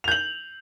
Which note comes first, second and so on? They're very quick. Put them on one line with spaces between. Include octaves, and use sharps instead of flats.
F7 G6 F#7